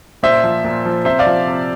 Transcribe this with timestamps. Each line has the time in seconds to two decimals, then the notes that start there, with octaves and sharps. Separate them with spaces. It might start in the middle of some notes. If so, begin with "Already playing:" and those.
0.23 A#2 C5 E5
0.44 F3
0.64 A#2
0.85 F3
1.05 C3 C5 E5
1.19 D5 F5
1.26 F3
1.47 C3